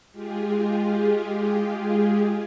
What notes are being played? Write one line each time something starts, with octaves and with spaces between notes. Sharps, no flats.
G#3 F4 G4 G#4